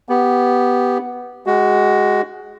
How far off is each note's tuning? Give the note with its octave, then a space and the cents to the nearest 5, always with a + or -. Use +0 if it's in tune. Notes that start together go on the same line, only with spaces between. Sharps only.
B3 +0 G4 +0
G#3 +0 F#4 +15